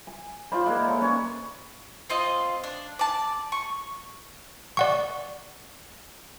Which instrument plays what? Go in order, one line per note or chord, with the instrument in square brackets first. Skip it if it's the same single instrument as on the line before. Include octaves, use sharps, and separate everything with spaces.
[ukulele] G#5
[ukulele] F4 B5 [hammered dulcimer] C5 D5 F5
[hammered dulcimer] G#3 A#3 E4 [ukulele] A#4 G5
[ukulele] A4 A#4 C#5
[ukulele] C#4 D5 G#5 [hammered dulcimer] B4 C#5
[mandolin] C4 F4 D#5
D4
D5 A5
C#6
[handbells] D5 F#5 C#6